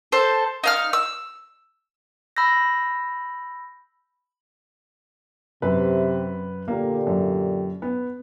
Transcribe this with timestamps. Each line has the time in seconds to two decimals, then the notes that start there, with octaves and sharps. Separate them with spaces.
0.12 A4 C5
0.64 D#4 F5 F6
0.93 E6
2.37 B5 E6 G6 A#6
5.62 F#2 C3 B4
6.68 A#2 D3 A#3 G4
7.07 F#2
7.82 B3